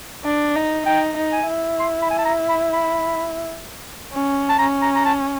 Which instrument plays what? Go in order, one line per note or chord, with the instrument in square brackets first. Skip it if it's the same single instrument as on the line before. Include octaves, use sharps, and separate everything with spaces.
[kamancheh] D4
D#4
[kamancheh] D#4 [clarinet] G5
[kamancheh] D#4
[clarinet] G#5
[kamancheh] E4
[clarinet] C6
B5
G#5
A5
A#5
B5
B5
[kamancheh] C#4
[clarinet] A5
[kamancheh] C#4 [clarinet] A#5
[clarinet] A#5
A#5
A5